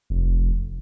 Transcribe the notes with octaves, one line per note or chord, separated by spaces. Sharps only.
F1